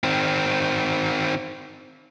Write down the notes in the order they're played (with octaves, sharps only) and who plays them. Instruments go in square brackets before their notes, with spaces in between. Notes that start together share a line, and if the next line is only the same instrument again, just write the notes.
[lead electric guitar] D#3 C4